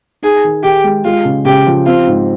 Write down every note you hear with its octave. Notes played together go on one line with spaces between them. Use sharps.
D#4 G#4
D#3
D#3 G4
G#3
G#3 F4
C#3
C#3 G4
F3
C4 F4
G#2